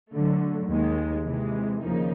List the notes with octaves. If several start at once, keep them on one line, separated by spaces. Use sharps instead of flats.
D3 F#3 A3
D#2 D#3 G#3
C3 E3 G#3
D#2 C#3 F3 A#3 D#4